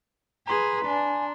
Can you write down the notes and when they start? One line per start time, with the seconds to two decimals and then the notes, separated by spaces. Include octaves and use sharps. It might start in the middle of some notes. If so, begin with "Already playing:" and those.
0.47 G#4 B4 A#5 C6
0.86 D4 G#5